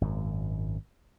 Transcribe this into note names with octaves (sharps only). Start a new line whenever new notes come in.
G#1 F#2